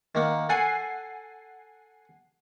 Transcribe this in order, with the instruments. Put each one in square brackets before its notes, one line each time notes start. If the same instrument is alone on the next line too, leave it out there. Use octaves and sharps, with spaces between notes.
[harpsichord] D#3 A#3 F#5
[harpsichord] A4 [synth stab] F#5 G#5 C7